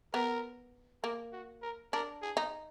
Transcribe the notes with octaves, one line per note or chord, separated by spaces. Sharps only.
B3 A#4
A#3 A#4
F#4
A#4
D4 A#4
G#4
D#4